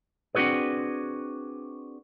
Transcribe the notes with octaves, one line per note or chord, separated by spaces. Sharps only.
C4 D4 D#4 F#4 G#4 B4